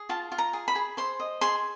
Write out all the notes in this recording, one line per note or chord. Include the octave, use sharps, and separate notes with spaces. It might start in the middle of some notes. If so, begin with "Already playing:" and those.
Already playing: G#4
F4 A5
F4
A#5
G#4
B5
G#4
C5 C6
D#5
G#4 C6